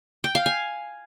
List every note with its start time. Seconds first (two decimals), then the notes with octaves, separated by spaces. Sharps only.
0.24 G5
0.35 F5
0.46 G#5